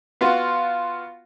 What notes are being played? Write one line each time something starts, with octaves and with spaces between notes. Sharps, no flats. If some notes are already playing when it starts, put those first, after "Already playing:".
B3 F4 F#4